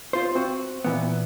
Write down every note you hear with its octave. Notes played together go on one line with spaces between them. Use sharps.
F4 C5
C4 F#4
A#2 E3 B3